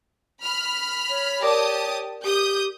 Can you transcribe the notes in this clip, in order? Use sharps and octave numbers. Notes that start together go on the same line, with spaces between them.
B5 F6
C#5
G4 A#4 D5 A5 D6 D#6
G4 D#6 G6